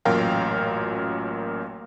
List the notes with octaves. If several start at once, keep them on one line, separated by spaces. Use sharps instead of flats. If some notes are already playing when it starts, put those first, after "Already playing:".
A1 F#2 A#2 A#4 F5 G5